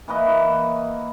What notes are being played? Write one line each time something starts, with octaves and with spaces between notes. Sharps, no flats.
E3 A#3 B4 D#5